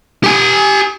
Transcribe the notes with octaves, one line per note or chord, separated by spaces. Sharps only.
G4 G#5